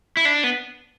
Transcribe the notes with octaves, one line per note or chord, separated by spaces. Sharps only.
E4
D4
B3